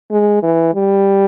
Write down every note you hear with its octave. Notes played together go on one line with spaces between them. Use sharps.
G#3
E3
G3